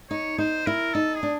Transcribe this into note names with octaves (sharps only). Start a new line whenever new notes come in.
D#4 C#5
D#4 C5
E4 A#4
D#4 A4
G#4
D4